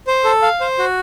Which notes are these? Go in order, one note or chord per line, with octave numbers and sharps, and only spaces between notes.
C5
A4
F5
C5
F#4